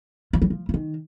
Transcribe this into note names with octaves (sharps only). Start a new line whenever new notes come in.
F3
F#3
F3
F3
D#3